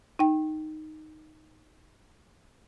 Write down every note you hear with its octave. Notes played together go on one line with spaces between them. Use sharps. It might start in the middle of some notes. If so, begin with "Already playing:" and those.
D#4 G5